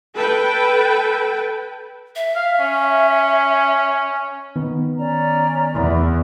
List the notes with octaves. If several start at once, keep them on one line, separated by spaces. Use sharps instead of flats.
A4 B4 G5
E5
F5
C#4
D#3 B3
C#4 D5 A#5
E2